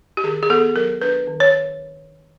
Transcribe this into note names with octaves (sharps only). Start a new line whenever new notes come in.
G4
D#3 G#4
G#4
B3 A4
F#3 A#4
D4 B4
D#3
C#5